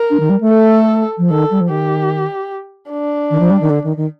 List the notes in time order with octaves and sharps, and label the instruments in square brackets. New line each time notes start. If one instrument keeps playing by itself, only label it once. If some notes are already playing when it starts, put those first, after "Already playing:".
Already playing: [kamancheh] A#4
[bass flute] D4
D#3
G3
A3
[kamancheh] A4
[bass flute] F3
[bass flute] D#3 [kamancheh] A4
[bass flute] G3
F3
[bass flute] D#3 [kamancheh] G4
[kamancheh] D4
[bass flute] D#3
F3
G3
D#3
D3
D#3
D#3